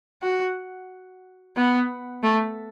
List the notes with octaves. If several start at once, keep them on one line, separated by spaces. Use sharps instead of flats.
F#4
B3
A3